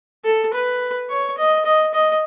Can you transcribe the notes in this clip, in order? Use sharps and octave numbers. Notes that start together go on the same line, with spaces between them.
A4
B4
C#5
D#5
D#5
D#5